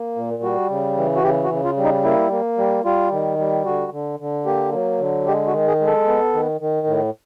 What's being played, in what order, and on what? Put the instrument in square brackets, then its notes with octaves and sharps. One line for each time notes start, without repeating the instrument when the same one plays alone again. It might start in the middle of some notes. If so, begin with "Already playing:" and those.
Already playing: [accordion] A#3
A#2
G3 F#4
C#3
E3
F#4
C#3 G4
F#4
C#3
F4
G3
D#4
A#3 E4
A#3
G3
G3 F4
D#3
G3
D3 F#4
D3
D3
A#3 G4
F#3
D3
G#3 G4
F#4
D#3
G#4
G#3
A4
B3
D#3
D#3
A2